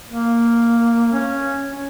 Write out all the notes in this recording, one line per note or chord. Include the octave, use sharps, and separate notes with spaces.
A#3
C#4
C#4